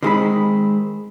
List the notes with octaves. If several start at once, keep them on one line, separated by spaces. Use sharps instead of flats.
D3 D#3 G#3 C4 D#4 B5